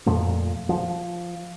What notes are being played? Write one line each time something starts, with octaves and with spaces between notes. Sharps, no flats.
F2 A#2 F3 A3
F3